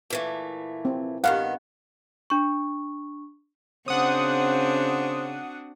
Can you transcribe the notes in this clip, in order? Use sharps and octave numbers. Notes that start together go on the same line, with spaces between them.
A#2 E3 A3
C4
G2 D#3 B3 F5 F#5
D4 C#6
C#3 C4 D4 F#4 C5 F#5 D#6